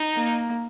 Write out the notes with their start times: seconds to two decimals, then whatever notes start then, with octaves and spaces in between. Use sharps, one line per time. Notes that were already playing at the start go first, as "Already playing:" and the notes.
Already playing: D#4
0.16 A#3